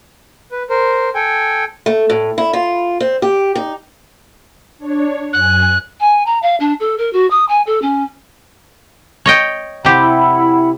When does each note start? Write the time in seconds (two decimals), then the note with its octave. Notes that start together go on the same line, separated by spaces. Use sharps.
0.52 B4
0.70 A#4 C5
1.15 A4 G5 G#5
1.86 A3
2.10 A2
2.38 E4
2.53 F4
3.00 C4
3.22 G4
3.55 D#4
4.78 D4 C#5
5.33 F#2 G#5 F#6
6.00 G#5
6.26 A#5
6.42 F5
6.60 D4
6.80 A4
6.98 A#4
7.13 F#4
7.30 D#6
7.48 G#5
7.66 A4
7.82 C#4
9.26 C#5 D#5 G5
9.85 C3 E4 G4 F#5 B5